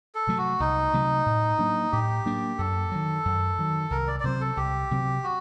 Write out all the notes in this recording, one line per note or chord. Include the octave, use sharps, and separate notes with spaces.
A4
C3 F#3 A3
F#4
C2 D#4
C3 F#3 A3
A2
F#3 A#3 D4
A2 G4
F#3 A#3 D4
F#2 A4
D#3 F#3
F#2
D#3 F#3
C2 A#4
D5
D5
C3 F#3 C4 C5
A4
C2 G4
C3 F#3 C4
F#4